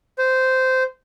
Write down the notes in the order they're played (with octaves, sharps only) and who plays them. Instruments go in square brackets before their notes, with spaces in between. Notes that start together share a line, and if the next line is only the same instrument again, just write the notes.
[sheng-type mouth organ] C5